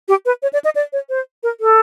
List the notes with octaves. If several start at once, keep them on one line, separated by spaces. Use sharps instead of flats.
G4
B4
C#5
D5
D#5
D5
C#5
C5
A#4
A4